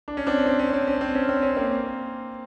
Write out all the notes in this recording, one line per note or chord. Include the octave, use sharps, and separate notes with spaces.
D4
C#4
C4 D4
C4
C#4
C4
C#4
C4
C#4
C4
C#4
A#3 C4